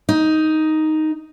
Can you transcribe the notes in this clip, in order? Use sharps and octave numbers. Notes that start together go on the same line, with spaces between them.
D#4